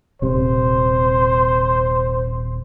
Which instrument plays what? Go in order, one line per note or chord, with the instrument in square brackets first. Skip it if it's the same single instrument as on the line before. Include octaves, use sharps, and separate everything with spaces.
[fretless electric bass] D#1 C3 [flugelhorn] C5